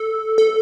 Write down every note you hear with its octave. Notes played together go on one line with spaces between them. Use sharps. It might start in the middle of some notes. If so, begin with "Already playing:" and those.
Already playing: A4
A4